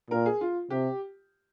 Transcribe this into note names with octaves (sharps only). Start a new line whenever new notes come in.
A#2 A#4
G#4
F4
C3 G4